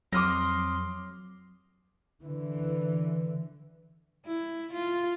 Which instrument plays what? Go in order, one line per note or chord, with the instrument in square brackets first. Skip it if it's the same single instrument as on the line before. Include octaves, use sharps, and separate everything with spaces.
[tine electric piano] F2 D#6 [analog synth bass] F#3 [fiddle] C6 [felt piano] D6 F6 A#6
[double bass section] D3 E3
[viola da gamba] E4
F4